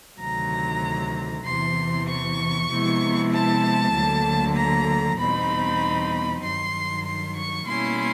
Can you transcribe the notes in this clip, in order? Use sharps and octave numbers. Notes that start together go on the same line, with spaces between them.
D2 C3 D#3 F#3 A#5
E2 C3 E3 C6
C#6
C3 F3 G#3 B3 E4
A5
D2 D3 F#3 A#3
A#5
E2 B2 G3 C4 D#4 B5
G2 D#3 F#3 C6
C6
C#6
B2 G3 A#3 C#4 E4 C6